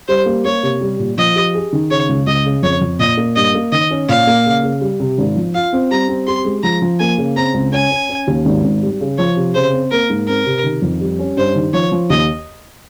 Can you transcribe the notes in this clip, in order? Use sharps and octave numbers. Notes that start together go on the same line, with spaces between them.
G3 C5
A#3
A#3 C#5
C3
G3
A#2
F3 D#5
G4
G#4
D#3
C#3 C#5
C#2
C#2 D#5
C#3
F2 C#5
F2
A#2 D#5
A#3
G2 D#5
A#3
D#3 D#5
C#4
A#2 F5
A#3
C#3
C#3
G3
C3
G#1
F3
F4 F5
C4
G3 A#5
C4
G4 C6
G#3
F3 A#5
F3
A#3 G#5
C#3
C4 A#5
C#2
C#4 G#5
C#4
C#4
D#2
G#1
G#1
G3
C#3
F3 C#5
C3
C#3 C5
C4
A#3 A#4
G#2
C4 A#4
C3
D#3
F2
G3
C#4
G2 C5
D#3
F3 C#5
F3
D#2 D#5